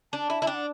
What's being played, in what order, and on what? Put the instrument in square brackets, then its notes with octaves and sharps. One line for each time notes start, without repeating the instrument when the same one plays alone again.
[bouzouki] D4 [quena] A5
[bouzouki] E4
E4
[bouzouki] D4 [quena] G5
[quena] F#5